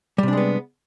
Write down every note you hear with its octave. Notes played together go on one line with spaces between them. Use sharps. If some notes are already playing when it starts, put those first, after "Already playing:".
C3 G3 G#3 B3 D4